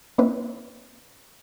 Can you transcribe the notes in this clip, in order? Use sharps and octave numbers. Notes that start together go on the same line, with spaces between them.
A#3 C4 C#4 D#4 E4 B4